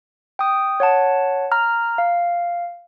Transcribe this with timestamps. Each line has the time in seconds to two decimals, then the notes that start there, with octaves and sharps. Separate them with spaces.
0.39 G5 D#6
0.80 C#5 F#5 A5
1.52 A#5 F6
1.98 F5